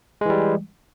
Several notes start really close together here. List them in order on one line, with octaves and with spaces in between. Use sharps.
G#3 E3 G3